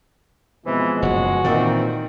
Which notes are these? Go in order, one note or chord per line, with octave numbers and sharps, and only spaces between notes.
B2 E3 F3 G#3 C4
F#1 F#4
A#2 D#3 E3 C4 D#4 A6